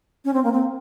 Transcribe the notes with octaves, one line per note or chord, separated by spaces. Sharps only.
C#4
C4
A#3
C4